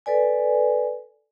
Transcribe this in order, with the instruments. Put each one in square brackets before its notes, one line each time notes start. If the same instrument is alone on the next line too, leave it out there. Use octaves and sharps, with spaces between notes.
[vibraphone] A4 B4 D5 G#5